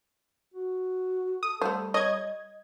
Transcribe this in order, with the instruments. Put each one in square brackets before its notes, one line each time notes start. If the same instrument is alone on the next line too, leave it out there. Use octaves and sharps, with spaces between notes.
[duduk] F#4
[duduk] A4 [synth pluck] D#6
[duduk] G3 [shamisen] A3 C5
[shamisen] C#5 [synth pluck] D#5 G#6